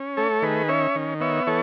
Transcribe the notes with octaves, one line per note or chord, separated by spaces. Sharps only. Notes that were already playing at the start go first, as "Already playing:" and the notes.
Already playing: C#4
A3 A4 C#5
D#3 G#4 B4
C#4 C#5 E5
D#3
B3 C#5 E5
E3 A4 C#5